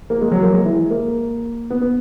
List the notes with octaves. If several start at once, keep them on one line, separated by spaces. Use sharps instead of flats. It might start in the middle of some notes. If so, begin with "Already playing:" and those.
A#3
G#3
F#3
A#3
G#3
E3
G#3
A#3
B3
B3